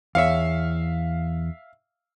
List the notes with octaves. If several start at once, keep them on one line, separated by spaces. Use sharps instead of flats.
E2 C#5 E5 F5